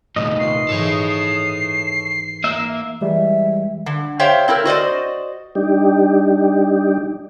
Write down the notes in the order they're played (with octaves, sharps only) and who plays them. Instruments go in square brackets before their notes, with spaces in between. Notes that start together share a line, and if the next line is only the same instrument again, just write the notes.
[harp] D#1 C7 [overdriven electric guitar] A2 C3 [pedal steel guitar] D#5
[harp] F4 B4 C#6 [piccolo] C7
[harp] G#2 E3 [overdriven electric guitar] A4 C#5
[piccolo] C7
[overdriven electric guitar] A#3 [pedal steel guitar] E5
[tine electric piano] E3 G3 G#3 [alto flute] E5
[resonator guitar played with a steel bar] D3
G4 C5 C#5 E5 F5 G5
C4 E4 A4 A#4
F#4 C5 D5 D#5
[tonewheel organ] G3 D4 D#4 G4